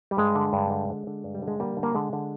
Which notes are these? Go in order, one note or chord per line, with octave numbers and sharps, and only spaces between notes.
G3
G2 G#3
D3
G2
D3
D3
D3
G2
G3
D3
G#3
D3 G3 A#3
D3
A#3
D3 G#3
D3